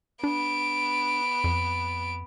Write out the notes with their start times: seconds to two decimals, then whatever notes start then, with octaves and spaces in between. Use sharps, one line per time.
0.23 B3 D4 D7
1.44 F2